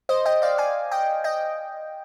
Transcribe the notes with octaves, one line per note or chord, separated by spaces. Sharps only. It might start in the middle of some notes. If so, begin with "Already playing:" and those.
C5 D#5
D#5 G5
D5 F5
F5 G#5
D#5 G5
D#5 G5